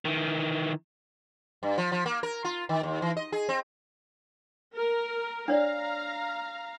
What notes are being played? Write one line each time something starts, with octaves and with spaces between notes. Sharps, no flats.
D#3 E3
G2
F3
F3
A#3
A#4
F4
D#3
D#2
E3
D#5
G#4
C4
A#4
D4 C#5 D5 F5 A#5